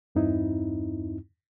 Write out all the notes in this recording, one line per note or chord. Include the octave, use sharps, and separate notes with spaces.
E2 G2 C4 D#4 E4